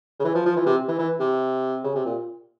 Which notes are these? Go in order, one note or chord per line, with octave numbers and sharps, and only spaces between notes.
C#3
E3
F3
F3
E3
C3
E3
E3
C3
C#3
C3
A#2